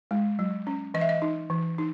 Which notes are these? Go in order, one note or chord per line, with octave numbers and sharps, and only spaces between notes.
G#3
F#3
C#4
E3 D#5
E5
D#5
D#4
E3
D#4